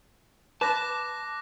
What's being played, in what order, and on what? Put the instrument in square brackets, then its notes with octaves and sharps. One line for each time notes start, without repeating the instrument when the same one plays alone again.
[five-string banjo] B4 [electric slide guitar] A5 [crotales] D6 F#6 A#6